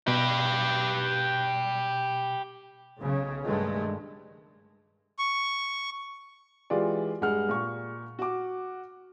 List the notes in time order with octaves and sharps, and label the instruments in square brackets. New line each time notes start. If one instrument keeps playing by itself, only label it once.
[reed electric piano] B2 [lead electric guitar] G4 B4
[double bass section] B1 C#3
G2 D#3 G#3 A3
[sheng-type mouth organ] C#6
[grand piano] E3 G#3 F4 G4 D5
G2 G#3 F#5 F6
A#2 C#6
F#4 D6